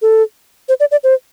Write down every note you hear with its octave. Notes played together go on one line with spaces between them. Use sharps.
A4
C5
D5
D5
C5